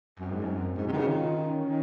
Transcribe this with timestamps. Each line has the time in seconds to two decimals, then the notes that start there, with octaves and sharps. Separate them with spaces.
0.19 F#2 C4
0.32 G#2
0.44 F#2 C4
0.77 G#2 F#4
0.87 C3
0.92 D#3
0.97 C#3
1.07 D#3 F4
1.36 C#4
1.65 D#3